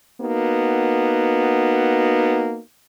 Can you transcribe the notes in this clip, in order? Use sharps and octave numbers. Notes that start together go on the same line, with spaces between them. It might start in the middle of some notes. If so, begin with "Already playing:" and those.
A#3 B3 D#4 F#4